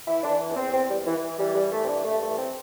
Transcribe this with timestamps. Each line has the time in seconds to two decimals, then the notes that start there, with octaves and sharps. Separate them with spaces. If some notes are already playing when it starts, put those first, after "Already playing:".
0.06 E3 E4
0.23 D4
0.29 E3
0.51 E2
0.56 C4
0.72 E2 C4
0.89 G3
0.94 E3
1.06 E3
1.17 E3
1.39 E3 G3
1.55 G3
1.61 E3
1.72 A3
1.83 G2 C4
1.89 D4
2.05 G2 A3
2.21 A3
2.27 E3
2.38 C4